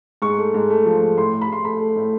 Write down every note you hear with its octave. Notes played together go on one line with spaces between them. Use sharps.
G#2 C#6
A3
G#2
A3
F3
G#2
A2 C6
A2
B5
A2 C6
A3 B5
A3
A2